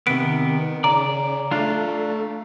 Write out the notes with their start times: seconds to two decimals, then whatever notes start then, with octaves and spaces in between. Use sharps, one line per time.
0.07 C3 D#3 B3 D7
0.84 C#3 D5 A#5
1.52 A3 D4 F4